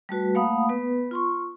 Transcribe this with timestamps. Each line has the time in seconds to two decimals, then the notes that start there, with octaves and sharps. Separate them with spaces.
0.09 G3 A3 F#4 B4
0.35 A3 A#3 F5 F#5 B5 D#6
0.69 B3 B4
1.11 F4 C6 C#6